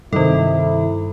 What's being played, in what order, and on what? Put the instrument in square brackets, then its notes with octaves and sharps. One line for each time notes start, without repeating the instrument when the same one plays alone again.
[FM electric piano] G2 [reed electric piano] C3 D#3 [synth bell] G3 A4 [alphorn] E4